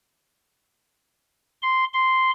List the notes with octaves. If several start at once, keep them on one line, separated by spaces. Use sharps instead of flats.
C6
C6